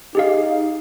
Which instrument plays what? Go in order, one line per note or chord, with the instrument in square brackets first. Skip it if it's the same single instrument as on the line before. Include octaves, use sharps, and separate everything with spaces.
[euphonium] D#4 [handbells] G4 G#4 F5